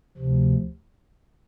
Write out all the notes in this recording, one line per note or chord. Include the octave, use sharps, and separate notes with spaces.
D2 C3 F3